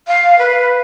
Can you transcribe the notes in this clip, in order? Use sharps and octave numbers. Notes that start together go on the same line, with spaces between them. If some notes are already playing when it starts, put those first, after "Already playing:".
F5
B4